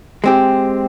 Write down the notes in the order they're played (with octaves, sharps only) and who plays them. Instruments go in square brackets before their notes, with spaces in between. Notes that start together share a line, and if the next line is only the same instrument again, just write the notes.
[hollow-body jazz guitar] G#3 C4 G4